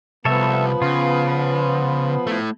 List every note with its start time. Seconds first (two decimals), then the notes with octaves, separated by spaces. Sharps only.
0.25 C2 F3 B3 A4 C#5 E5
0.82 C#3 F4
2.27 A3 E4